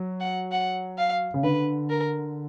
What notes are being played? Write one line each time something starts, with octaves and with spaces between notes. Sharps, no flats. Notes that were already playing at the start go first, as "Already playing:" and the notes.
Already playing: F#3
F#5
F#5
F5
C#3
D3 B4
A#4